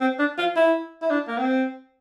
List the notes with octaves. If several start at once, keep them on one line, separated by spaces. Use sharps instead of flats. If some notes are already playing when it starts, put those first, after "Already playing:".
C4
D4
F4
E4
E4
D4
A#3
C4